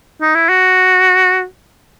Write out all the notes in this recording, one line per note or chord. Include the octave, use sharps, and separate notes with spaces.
D#4
E4
F#4